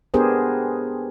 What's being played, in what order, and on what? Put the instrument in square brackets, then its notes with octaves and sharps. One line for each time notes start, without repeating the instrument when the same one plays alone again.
[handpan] B3 D4 G4 G#4 A#4 C5